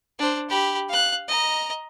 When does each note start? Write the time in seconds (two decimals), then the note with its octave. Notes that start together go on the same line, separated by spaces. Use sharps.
0.19 D4 C5
0.49 G4 B5
0.89 F5 F#6
1.28 D#5 A#5